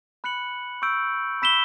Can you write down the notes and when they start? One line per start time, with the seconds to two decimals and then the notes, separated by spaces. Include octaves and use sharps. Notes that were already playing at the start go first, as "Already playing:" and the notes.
0.24 B5 F#6 C#7 F#7
0.82 C#6 E6 G6 D7
1.42 B5 E6 B6 E7 G7